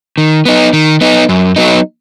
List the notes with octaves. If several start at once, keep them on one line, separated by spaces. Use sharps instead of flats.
D#3
B3 D#4
D#3
B3 D#4
F#2
F#3 B3 D#4